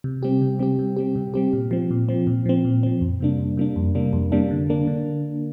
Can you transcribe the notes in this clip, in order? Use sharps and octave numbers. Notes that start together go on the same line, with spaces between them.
C3
G3 C4 G4
C3
G3 C4 G4
C3
G3 C4 G4
C3
G3 C4 G4
A#2
F3 C4
A#2
F3 C4
A#2
F3 C4
A#2
F3 C4
F2
C3 G3 A#3 D4
F2
C3 G3 A#3 D4
F2
C3 G3 A#3 D4
F2
C3 G3 A#3 D4
D3
A#3 D4
D3